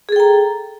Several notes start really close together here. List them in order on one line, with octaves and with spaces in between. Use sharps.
G#4 A4 G5 A#5